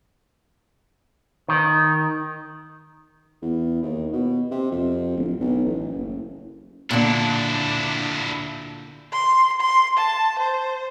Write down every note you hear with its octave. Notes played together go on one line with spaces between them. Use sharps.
D#3
E2
D#2
B2
C3
F2
D1
B1
A1
F#1
A#2 D3 D4 E4
C6
C6
A5
C5